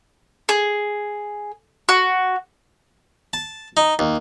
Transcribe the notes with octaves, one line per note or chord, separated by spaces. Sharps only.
G#4
F#4
A5
D#4
D#2